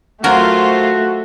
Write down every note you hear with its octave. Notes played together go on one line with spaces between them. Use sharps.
F#3 A3 F4 F#4 A#4 C5